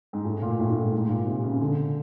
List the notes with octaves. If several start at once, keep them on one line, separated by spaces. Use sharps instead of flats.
G#2
A2
A#2
A2
A2
G#2
G#2
A#2
C3
C#3
D3